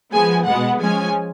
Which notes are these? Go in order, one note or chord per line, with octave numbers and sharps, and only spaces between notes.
F3 G#3 B3 G#5
B2 G#3 B3 F#5
F3 G#3 C#4 G#5